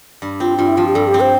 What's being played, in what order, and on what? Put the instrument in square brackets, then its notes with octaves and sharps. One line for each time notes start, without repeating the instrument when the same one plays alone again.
[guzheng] G2
[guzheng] C4 [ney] F4
[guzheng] G2 [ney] F4
[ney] E4
[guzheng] F3 [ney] F4
[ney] G4
[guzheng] G2 [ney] A4
[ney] G4
[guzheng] C4
[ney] C5